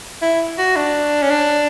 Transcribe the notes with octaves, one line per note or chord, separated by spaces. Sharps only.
E4
F#4
D4
C#4
D4